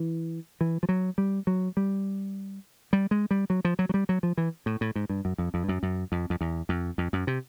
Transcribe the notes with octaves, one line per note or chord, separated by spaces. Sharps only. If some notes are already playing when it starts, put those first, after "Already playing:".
Already playing: E3
E3
F3
F#3
G3
F#3
G3
G3
G#3
G3
F#3
F3
F#3
F#3
G3
F#3
F3
E3
A2
A2
G#2
G2
F#2
F2
F2
G2
F#2
F#2
F2
F2
E2
F2
F2
F#2
C3